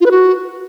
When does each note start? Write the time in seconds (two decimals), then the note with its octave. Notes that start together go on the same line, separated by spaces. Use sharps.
0.01 F4
0.06 B4
0.11 F#4